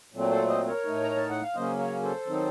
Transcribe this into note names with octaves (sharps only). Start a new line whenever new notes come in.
A#2 F#3 A3 C4
A4 C5
C5 D#5
A#4 C#5
A2 A3 D#4
A#5
A5
F#5
F5
C#3 F#3 A#3 C#4 C5 D#5
A#4 C#5
A4 C5
D#3 F#3 C4 D#4